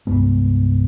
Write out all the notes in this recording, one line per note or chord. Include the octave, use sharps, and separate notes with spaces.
C2 G2 G#3 B3